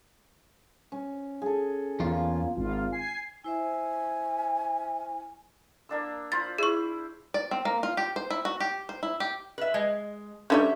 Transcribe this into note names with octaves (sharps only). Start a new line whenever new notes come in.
C#4
G#4 A4
E2 A#3 C#4 F4
G#1 F4
G#5 C7
E4 C5 E5 G#5
A#3 D4 E6
F4 C5 B5 A6
E4 G#4 C#6
D5
C4
A#3
F4
G4
C5
E4
F#4
G4
C5
E4
G4
B4 E5
G#3
D3 F#3 G3 C#4 E5